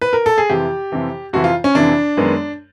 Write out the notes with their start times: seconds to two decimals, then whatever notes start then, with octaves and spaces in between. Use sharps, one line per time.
0.02 B4
0.13 A#4
0.26 A4
0.38 G#4
0.50 F2 C3 E3 G4
0.92 F2 C3 E3
1.33 F2 C3 E3 F#4
1.44 F4
1.64 C#4
1.75 F2 C3 E3 D4
2.17 F#2 D#3 G#3 B3